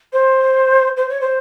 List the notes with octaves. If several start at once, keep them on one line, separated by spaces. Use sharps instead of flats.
C5
C5
C#5
C5